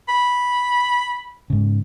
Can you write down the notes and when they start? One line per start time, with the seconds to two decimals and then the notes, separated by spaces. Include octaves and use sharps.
0.08 B5
1.50 G#2 C#3